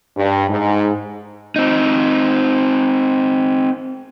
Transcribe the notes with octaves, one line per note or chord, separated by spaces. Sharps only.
G2
G#2
C4 D#4